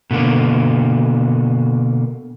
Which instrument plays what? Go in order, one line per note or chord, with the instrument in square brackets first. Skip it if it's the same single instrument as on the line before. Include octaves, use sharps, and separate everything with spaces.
[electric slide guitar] B2 D3 A#3